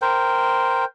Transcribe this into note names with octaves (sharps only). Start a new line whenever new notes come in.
A#4 C5 G5